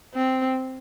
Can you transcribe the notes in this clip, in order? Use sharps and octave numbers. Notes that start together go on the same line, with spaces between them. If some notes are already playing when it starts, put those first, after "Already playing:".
C4